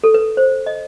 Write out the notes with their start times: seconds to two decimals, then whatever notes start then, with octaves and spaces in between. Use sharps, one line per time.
0.04 A4
0.14 B4
0.37 C5
0.66 D#5